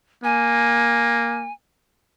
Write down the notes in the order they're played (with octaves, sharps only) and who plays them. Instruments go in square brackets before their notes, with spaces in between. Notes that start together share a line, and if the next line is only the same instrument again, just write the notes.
[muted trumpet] A#3 [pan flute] G#5